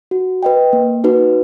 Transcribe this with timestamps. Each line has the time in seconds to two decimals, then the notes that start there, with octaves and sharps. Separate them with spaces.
0.11 F#4
0.43 B4 D#5 G5
0.73 A#3
1.04 D#4 F#4 B4